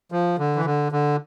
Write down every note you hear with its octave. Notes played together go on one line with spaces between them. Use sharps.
F3
D3
E3
D3
D3